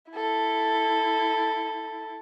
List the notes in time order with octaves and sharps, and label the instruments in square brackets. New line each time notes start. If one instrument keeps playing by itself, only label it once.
[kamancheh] E4 A4